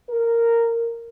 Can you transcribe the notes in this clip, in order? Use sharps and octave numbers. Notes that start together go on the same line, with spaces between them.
A#4